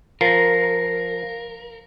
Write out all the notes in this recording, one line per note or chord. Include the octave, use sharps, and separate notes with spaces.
F3 A#4 A#6 C7